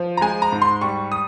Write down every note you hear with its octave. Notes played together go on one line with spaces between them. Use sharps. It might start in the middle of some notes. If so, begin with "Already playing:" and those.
Already playing: F3
A#5
G#3 G#5
A#5
G#2
C6
G3 C#6
D#6